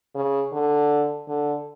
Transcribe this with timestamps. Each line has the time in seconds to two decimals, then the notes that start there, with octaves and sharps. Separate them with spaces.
0.15 C#3
0.52 D3
1.28 D3